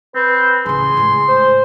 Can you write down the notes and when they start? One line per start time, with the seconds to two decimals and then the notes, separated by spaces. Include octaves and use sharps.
0.15 C4 B4
0.66 A1 C#3 G#4 C6
0.97 A2 G#3
1.28 C5